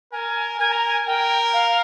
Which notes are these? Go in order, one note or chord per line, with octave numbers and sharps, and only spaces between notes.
A#4 G#5
A#4 G#5
A#5
G#5
A#4 G5
F5